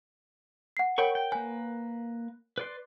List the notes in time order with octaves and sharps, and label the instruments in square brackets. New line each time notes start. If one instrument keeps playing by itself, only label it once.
[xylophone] F#5 C7
[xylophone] A#4 C#5 F#5 [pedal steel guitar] G5 B5 C#6
[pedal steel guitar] G5
[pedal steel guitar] A#3 B4 [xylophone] G#5
[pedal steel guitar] B4 D5 C6